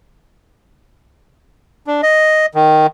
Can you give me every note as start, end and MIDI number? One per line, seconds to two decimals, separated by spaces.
1.87 2.01 62
2.03 2.46 75
2.55 2.87 51